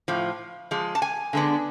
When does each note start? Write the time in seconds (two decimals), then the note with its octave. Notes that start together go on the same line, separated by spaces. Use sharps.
0.08 A2 F3
0.71 F3 G#3
0.95 A5
1.02 G#5
1.33 D3 G#3 B3 D4